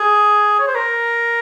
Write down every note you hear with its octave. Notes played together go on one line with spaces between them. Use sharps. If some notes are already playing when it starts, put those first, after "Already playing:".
Already playing: G#4
C#5
C5
A#4